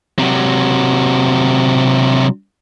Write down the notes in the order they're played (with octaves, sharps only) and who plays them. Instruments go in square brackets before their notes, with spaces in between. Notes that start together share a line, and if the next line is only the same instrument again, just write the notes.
[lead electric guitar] C3 F#3